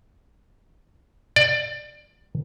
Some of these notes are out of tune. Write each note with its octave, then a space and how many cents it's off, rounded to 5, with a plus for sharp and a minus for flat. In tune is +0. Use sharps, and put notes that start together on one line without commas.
D5 +20